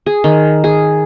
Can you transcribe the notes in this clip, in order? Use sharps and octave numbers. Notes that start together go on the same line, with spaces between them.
G#4
D#3
G#4